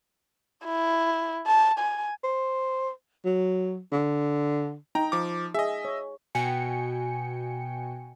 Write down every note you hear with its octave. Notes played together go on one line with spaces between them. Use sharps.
E4
A5
G#5
C5
F#3
D3
D#4 G5 A#5
F3 D6
G#4 D#5 E5
C#5
B2 F#4 G5 G#5 C#7